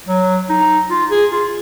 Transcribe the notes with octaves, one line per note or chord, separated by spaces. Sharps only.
F#3
D#4
F4
G#4
F4